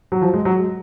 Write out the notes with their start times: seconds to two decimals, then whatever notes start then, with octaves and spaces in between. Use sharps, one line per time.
0.12 F#3
0.22 F3
0.34 G#3
0.45 F#3
0.59 G#3